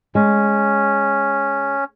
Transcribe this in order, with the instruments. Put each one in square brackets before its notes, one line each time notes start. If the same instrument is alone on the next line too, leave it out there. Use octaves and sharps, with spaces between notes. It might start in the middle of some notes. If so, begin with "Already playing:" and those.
[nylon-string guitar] G#3 [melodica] C#4